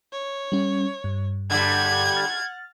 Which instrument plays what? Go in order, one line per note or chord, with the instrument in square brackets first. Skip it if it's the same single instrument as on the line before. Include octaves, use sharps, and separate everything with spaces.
[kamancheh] C#5
[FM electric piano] G3 C#4
G2
[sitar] D3 G3 [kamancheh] F#5 [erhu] G#6
[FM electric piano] F6 A6